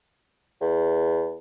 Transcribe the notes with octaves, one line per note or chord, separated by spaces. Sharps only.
E2